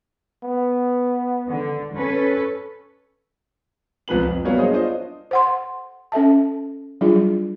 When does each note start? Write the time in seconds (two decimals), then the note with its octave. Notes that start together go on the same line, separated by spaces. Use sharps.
0.43 B3
1.50 D3
1.94 C#4 A4 B4
4.08 C2 F3 B4 F#7
4.24 F2
4.45 F#3 G3 A#3 B3 C#5 F5
4.58 D4 G#4 C5 C#5 D#5
4.71 D4 F4 C5 D#5
5.31 C5 F#5 C6
6.12 C#4 A4 E5 A5
7.01 F#3 G3 D4 E4 F4 G#4